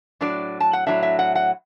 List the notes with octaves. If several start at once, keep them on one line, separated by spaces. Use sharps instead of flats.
A2 F#3 D4 D5
A5
F#5
A2 F#3 D4 E5
E5
F#5
F#5